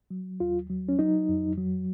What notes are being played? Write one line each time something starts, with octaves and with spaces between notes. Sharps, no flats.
F#3
D#2 F4
F#3
C#4
F#3 D#4
F2
F#3